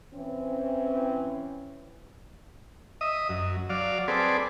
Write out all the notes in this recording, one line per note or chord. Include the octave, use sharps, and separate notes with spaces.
E3 C4 C#4
D#5 E5 D#6
F#2
F#3 D5 F5
C4 G#4 A4 B4 D5